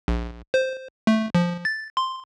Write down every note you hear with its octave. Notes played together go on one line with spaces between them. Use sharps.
A#1
C5
A3
F3
A6
C6